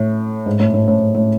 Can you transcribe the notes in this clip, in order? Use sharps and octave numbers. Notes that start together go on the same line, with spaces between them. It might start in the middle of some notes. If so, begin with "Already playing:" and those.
Already playing: A2
G#2
A2
A2
A2
A2